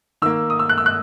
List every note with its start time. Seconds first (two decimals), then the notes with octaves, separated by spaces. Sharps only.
0.22 D#3 A#3 E6
0.50 D#6
0.59 E6
0.69 F#6
0.78 E6
0.86 F#6